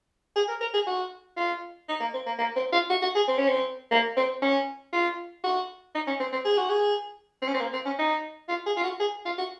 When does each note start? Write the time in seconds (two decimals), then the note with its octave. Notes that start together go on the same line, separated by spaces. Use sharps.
0.36 G#4
0.49 A#4
0.61 A#4
0.74 G#4
0.87 F#4
1.37 F4
1.89 D#4
2.00 A#3
2.14 C4
2.26 A#3
2.39 A#3
2.56 C4
2.72 F4
2.90 F#4
3.02 F#4
3.15 G#4
3.28 C4
3.38 C#4
3.49 C4
3.91 A#3
4.17 C4
4.42 C#4
4.93 F4
5.44 F#4
5.95 D#4
6.07 C#4
6.20 C4
6.32 C4
6.45 G#4
6.58 F#4
6.70 G#4
7.42 C4
7.48 C#4
7.54 C4
7.60 A#3
7.73 C4
7.85 C#4
7.99 D#4
8.49 F4
8.66 G#4
8.77 F4
8.83 F#4
9.00 G#4
9.26 F4
9.38 F#4